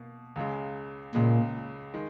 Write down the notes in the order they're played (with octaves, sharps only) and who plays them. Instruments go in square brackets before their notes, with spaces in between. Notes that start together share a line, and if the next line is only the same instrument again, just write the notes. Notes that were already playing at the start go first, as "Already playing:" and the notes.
Already playing: [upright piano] B2 A#3
C#2 C#3 G#3
[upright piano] C#2 C#3 G#3 [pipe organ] A#2
[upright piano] D#3 G#3